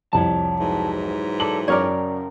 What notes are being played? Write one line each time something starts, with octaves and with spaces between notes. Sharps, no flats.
C2 F2 C#5 D5 A5
G#2 E3 F#3
A4 D5 F#7
F#2 C#3 A#4 C#5 D5 G5 F6